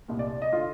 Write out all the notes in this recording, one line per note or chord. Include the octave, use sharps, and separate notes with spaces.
C2 A#2
D5
D#5
D3 F4